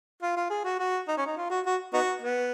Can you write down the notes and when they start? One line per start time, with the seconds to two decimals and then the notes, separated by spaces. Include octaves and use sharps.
0.22 F4
0.36 F4
0.50 G#4
0.65 F#4
0.79 F#4
1.08 D#4
1.17 C#4
1.26 D#4
1.37 F4
1.50 F#4
1.66 F#4
1.93 B3 D#4 F#4
2.22 B3